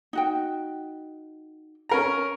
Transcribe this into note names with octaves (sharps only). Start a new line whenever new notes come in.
D#4 F#4 G5
C#4 A#4 A#5